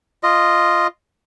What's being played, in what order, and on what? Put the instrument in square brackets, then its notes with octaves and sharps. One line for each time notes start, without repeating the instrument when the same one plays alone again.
[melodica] F4 D#5